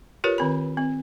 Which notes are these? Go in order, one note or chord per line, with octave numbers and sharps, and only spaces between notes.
F4 G4 A#4 B4 C#5
D#3 C4 B5
C4